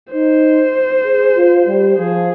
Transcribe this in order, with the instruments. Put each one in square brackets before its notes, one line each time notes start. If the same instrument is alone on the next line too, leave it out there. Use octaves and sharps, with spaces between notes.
[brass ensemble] D#4 [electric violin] C5
[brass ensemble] G#4
F4
G3
[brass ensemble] F3 [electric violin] G#4